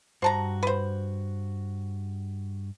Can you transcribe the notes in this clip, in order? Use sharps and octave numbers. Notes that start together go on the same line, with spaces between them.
G2 F#4 C5 A5 A#5
B4 C5